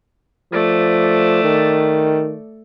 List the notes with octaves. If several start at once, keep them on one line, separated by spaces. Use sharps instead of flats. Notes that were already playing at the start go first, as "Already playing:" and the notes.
F3 A3 D5
D#3